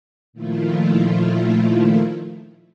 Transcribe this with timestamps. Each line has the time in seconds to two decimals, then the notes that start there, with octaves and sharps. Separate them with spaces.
0.33 A#2 D#3 F3 A3 E4 F4